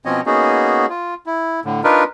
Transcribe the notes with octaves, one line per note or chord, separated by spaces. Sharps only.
B2 F3 C4 C#4 C#5 D#5
A#3 B3 C#4 D#4 F#4 G#4
F4
E4
A2 D3
D4 D#4 F4 A#4 B4